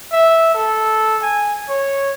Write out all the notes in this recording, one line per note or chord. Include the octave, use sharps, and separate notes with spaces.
E5
A4
G#5
C#5